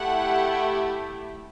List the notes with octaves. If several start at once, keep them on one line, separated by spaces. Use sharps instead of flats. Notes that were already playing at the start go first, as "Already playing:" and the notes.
Already playing: A3 E4 G4 F#5